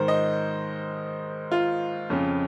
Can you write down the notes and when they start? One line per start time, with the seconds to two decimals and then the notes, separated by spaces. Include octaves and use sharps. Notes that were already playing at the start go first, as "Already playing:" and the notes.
Already playing: G#2 D#3 C5
0.08 D#5
1.52 F4
2.10 F2 C#3